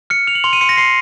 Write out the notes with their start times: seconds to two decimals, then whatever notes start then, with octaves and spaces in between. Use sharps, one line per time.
0.10 F6 C#7
0.27 F6 F7
0.35 F#7
0.44 C6 F7
0.53 D#7
0.61 C6 C#7
0.69 A#6
0.77 C6 C7